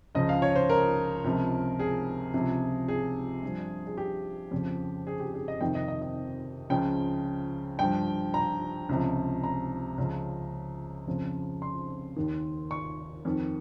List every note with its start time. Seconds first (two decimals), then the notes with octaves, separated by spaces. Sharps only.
0.15 C#2 C#3 F3 D#5
0.29 F5
0.42 C#5
0.56 C5
0.70 A#4
1.24 C#2 C3 F3
1.79 G#4
2.33 C#2 C3 F3
2.88 G#4
3.43 G2 F3
3.87 G#4
3.98 G4
4.51 F2 C#3 F3
5.07 G#4
5.20 G4
5.34 G#4
5.48 D#5
5.61 F2 C3 D#3 G5
5.75 D#5
5.88 D#5
6.02 D#5
6.70 C#2 C#3 F3 G5
7.79 G2 F3 G5
8.34 A#5
8.89 C#2 C3 F3
9.43 A#5
9.98 C#2 C#3 F3
11.07 F2 C#3 F3
11.62 C6
12.16 D#2 D#3
12.71 C#6
13.25 F2 D#3